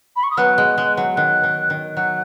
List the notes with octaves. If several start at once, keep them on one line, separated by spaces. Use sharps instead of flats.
B5
C#6
D#6
F#3 B3 F#6
G#3
G#3
F#3
D#3 F#6
D#3
D#3
F#3 F#6